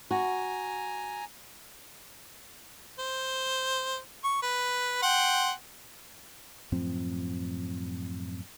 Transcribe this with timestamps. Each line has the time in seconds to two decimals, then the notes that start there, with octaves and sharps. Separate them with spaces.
0.11 F#4 G#5 A#5
2.99 C5
4.24 C#6
4.42 B4
5.02 F#5 G5 C6
6.72 F#2 A2 F3 C4